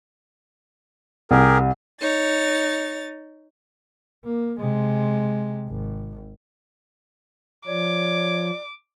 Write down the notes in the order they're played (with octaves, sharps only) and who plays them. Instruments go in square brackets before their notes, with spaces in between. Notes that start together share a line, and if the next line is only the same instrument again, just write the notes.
[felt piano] C2 [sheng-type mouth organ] G4 G#4 A#4
[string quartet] D#4 C#5 A6
[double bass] A#3
C3 G#3
G#1
[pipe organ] F3 [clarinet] C#5 [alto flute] D5 [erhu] D6